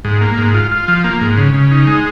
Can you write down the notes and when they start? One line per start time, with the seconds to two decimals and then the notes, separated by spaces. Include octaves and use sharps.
0.05 G#2
0.21 A#3
0.38 G#2
0.54 F4
0.71 F4
0.88 F3
1.04 A#3
1.21 G#2
1.37 C#3
1.54 C#3
1.71 D#4
1.87 G#3